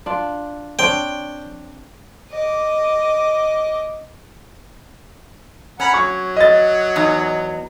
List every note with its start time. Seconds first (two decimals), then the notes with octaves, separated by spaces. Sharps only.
0.06 D4 F4
0.79 C4 D4 C#5 G5
2.30 D#5 D6
5.80 C#4 F#5 A#5 B5
5.94 F#3 C#6
6.36 D#5 A6
6.96 E2 D#4